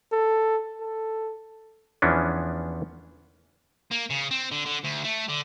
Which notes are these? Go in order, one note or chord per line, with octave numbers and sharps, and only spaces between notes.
A4
A4
E2 E3 F3 B3 C#4 D4
A#3
C#3
C4
D3
D3
D2
A3
D3